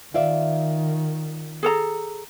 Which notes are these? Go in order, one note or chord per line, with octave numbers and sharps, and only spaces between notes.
D#3 F4 D5 E5
G#4 A4 A#5